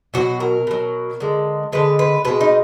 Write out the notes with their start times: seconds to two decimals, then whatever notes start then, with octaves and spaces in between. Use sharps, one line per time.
0.14 B2 F#3 F#4
0.40 A#4
0.67 B2 F#3
1.20 D3 G#3
1.72 D3 G#3 B4
1.99 B4
2.25 B2 G#3 B4
2.41 D#4